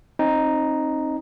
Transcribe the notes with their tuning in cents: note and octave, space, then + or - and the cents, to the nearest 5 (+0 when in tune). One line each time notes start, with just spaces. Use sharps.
C4 +35 D#4 +0